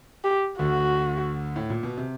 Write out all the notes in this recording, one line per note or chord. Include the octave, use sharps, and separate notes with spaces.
G4
D2 D3 F#4
A2
A#2
B2
C3